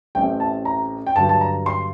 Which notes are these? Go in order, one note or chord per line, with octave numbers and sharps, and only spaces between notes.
A1 A2 A3 C4 G5
A5
A#5
G5
G2 D3 F#3 A5
A5
A#5
C6